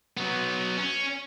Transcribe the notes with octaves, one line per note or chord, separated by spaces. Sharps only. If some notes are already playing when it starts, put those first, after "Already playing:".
F#3 B3
C#4